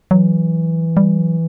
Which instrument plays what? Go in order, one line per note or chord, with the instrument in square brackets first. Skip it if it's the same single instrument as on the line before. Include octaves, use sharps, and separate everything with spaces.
[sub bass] E3 [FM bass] F#3
[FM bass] G3
F#3